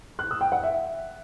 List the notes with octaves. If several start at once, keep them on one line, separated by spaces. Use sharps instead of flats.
F#6
E6
G5
F#5
E5